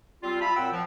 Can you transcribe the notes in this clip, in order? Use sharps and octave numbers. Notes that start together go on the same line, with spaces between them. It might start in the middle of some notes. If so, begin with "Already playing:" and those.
G3 C4 F4
F4 E5 A5 B5
F#2 A#2 C4 F#5 G5 E6
F3